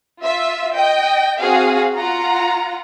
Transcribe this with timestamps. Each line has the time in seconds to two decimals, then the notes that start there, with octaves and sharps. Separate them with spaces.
0.20 F4 E5
0.75 D#5 G5
1.40 C4 F#4 G#4 F5
1.95 F4 F#5 A#5